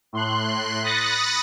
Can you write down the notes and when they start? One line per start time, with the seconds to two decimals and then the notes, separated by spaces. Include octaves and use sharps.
0.13 A2 C6 F#6
0.84 B5 D#6 F#6 A6 A#6 C#7